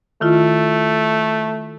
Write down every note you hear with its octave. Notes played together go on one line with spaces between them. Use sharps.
D#3 A3 E4 F4